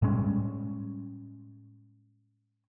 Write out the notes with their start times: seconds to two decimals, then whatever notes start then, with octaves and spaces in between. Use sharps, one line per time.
0.02 A2 G3 G#3 C#4